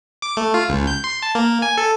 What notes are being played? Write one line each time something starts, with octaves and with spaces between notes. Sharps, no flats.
D6
A3
F4
C#2
G6
C6
A5
A#3
G#5
A4